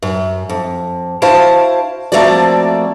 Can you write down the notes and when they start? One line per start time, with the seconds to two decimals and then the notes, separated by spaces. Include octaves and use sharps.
0.02 F#2
0.49 F2
1.22 E4 F#4 C5 F5 A5
2.12 F3 A3 A#3 C4 F#4 D5